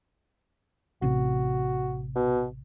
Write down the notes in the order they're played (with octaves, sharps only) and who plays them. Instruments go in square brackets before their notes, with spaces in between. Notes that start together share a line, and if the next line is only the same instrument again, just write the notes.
[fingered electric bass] A1 C3 [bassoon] F#4
[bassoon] B2